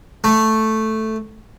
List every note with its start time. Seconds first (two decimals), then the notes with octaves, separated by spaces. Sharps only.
0.24 A3